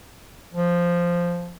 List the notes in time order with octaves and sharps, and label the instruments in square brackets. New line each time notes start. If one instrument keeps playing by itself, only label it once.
[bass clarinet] F3